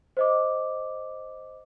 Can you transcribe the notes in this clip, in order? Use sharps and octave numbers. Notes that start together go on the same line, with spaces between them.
C5 D#5 D6